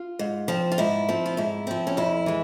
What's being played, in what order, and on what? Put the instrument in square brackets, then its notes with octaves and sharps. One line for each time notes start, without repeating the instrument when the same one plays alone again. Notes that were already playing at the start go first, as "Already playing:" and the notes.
Already playing: [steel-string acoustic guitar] F4
G#2
F3 C4
F4
G#2 E4
F3 C4
F4
G#2 E4
F3 C4
C#4
F2 E4
E3 G#3